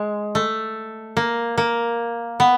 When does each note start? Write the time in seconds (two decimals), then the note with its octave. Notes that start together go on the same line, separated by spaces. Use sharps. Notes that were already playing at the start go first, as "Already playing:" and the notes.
Already playing: G#3
0.35 A3
1.17 A#3
1.58 A#3
2.40 B3